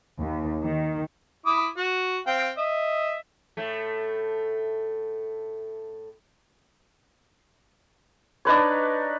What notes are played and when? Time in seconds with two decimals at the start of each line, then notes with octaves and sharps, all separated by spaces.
0.20 D#2
0.64 D#3
1.46 E4 D6 D#6
1.77 F#4
2.27 C4 F5 G5
2.58 D#5 E5
3.57 A2 A3
8.45 D4 D#4 B4 C#5